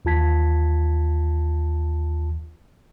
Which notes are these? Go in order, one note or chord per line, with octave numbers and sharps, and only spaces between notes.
D#2 E3 F4 A5 G#6 B6